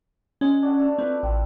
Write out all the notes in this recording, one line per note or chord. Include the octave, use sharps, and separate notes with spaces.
G#3 C#4
D4 F#4 A4
A3
C4 E4 F4 B4
A1 C4